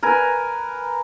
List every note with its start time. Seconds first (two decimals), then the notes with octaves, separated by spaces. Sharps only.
0.03 A#4 B4 G#5